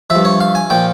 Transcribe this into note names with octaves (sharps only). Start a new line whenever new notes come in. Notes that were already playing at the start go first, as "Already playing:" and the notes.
F3 E5
G2
C#5
F5
G#5
A#2 F3 G5